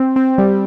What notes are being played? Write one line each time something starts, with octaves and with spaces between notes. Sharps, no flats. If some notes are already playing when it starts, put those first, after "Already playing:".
Already playing: C4
C4
G3